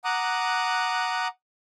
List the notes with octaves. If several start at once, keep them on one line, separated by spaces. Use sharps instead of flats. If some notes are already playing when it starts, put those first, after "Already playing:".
F#5 A#5 D6 D#6 F#6